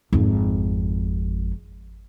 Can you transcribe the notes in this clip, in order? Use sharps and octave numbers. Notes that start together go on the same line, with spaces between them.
G#1 F2